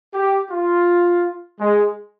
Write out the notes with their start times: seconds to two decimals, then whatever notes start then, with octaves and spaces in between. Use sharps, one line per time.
0.15 G4
0.51 F4
1.60 G#3